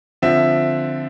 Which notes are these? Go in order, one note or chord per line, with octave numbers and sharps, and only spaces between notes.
D3 F3 C4 E5